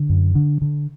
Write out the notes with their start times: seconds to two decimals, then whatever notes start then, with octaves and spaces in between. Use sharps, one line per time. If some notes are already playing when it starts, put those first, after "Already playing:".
Already playing: D3
0.09 F#2
0.35 D3
0.62 D3